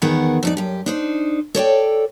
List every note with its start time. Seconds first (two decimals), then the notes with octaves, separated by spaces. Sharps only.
0.02 E2 D#3 B3 G#4 A#4 F#5
0.43 F2 D#4 D5
0.57 F#2 G4
0.86 D4 D#4 C5
1.55 A4 C#5 D5 G5